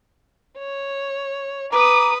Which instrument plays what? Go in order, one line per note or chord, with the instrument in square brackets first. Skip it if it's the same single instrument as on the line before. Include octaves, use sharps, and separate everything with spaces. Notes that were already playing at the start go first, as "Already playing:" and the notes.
[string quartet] C#5
[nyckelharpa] B4 [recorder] A#5 [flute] D6 [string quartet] D#6